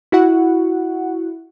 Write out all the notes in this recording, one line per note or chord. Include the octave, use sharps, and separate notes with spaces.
E4 F#4 F#5